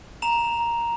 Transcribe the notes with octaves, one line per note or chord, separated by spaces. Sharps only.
A#5 E7 F7